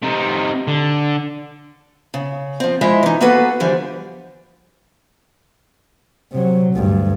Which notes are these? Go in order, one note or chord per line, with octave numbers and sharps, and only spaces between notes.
C3 D#4
D3
C#3
F3 C4
F3 G#3 E4 D#5 E5
E3 D#4
A#3 B3 F#4 G#4 A4 B4
D3 E3 F3 G3
C3 F#3
D2 G2